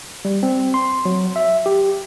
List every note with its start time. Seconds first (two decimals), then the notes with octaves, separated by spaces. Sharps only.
0.25 G3
0.43 C4
0.74 C6
1.05 F#3
1.36 E5
1.66 G4